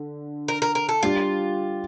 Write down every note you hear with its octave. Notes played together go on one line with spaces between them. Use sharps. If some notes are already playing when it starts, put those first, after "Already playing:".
Already playing: D3
A#4
A#4
A#4
A4
G3 D4 F4 G4